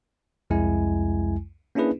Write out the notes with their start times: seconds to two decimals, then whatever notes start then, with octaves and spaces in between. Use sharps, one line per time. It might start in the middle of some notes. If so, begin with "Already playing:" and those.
0.50 C2 F2 G#3 E4 G#5
1.75 A#3 C#4 D4 E4 G#4 B4